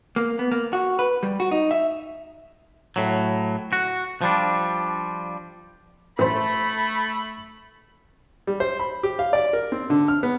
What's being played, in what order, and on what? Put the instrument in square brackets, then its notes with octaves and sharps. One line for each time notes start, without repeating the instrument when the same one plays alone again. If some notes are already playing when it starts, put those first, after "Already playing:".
[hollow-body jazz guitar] A#3
B3
A#3
F#4
B4
G3
F#4
D#4
E5
[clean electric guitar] A2 F#3
F#4
F3 G3 D4
[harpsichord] A1 C5 [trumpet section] A3 [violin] B5
[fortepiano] G3
C5
B5
G4
F5
D5
A#4
C4
D3
F6
B3